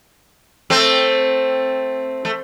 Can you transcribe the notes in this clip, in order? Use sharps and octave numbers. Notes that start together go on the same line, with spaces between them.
A3 C4
A3